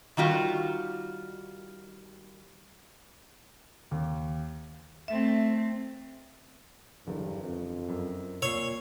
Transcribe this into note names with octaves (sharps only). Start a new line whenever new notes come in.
D#3 G3 F4 F#4
D#2
A3 C4 E5
F#1 E2 G2 D3
F2
F#2
A#2 C#5 E6 C7